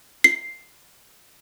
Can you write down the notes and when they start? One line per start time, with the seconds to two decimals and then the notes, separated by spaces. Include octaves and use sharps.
0.24 C7